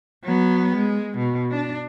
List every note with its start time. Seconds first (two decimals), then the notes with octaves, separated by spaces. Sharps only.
0.24 F#3 B3
0.75 G#3
1.18 B2
1.51 D4